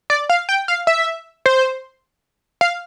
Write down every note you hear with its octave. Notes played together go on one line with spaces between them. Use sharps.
D5
F5
G5
F5
E5
C5
F5